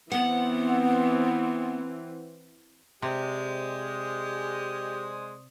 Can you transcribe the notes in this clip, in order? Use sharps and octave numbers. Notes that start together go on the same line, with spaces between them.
E3 B3 C4 F#5
C3 G#3 G4 C5 D5 D#6